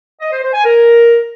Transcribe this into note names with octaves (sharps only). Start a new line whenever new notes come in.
D#5
C5
C5
G#5
A#4